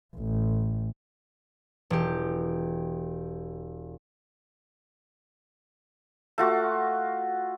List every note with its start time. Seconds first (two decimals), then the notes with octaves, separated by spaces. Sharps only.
0.16 A1
1.90 E1 G4
6.38 A3 F4 F#4